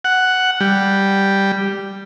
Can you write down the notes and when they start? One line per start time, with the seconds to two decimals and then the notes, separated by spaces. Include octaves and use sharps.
0.05 F#5
0.60 G3